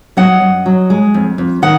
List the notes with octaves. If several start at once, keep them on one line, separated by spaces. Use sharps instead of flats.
F#3 D#5 F#5
F#2
F#3
G#3
F2
F2
D#3 D#5 F#5